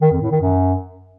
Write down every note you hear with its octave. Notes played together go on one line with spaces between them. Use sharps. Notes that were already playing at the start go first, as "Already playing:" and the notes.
D#3
F2
A2
D#3
F#2